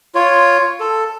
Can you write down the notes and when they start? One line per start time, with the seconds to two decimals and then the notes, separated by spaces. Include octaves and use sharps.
0.15 F4 C#5
0.80 A4